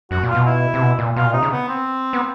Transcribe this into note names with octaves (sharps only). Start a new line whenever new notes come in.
F#2 F#4
A#2
F4
B2
E4
C3
B2
A#2
B2 F4
A#2
C3 D#4
C#3
B3
C4
B3